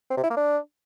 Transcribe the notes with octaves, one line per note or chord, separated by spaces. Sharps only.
C4
C3
E4
A#3
D4